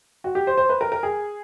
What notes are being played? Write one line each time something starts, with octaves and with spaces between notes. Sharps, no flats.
F#4
G4
C5
C5
B4
A#4
A#4
G#4